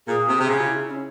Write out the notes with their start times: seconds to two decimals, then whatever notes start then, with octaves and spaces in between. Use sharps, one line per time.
0.08 A#2 G#4
0.28 C3
0.40 C3
0.47 C#3 G4
0.59 F4
0.67 E4
0.90 C#4